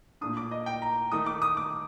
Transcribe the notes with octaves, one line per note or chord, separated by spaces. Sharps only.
A#2 A3 D4 D#6
D6
D#5
G5
A#5
D#3 A3 D#4 D#6
D6
D#6
D6